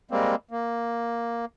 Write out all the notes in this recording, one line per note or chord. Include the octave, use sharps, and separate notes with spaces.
G3 G#3 A#3 C4
A#3